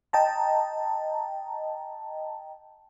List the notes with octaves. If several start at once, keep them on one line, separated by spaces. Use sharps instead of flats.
D#5 G5 A5 A#5